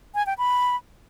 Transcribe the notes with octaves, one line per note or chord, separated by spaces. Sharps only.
G#5
G5
B5